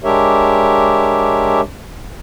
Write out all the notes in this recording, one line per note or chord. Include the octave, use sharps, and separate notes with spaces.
G#3 D4 G4 A#4 C#5 E5